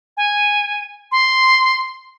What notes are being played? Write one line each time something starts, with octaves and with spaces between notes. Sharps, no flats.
G#5
C6